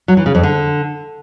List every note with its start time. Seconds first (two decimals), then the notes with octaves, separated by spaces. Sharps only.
0.08 F#3
0.17 E3
0.26 C#3
0.35 F2
0.43 D3